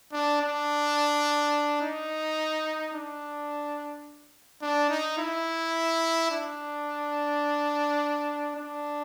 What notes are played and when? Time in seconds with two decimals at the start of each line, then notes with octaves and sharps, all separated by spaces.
0.12 D4
0.41 D4
1.81 D#4
2.93 D4
4.62 D4
4.90 D#4
5.18 E4
6.31 D4
8.56 D4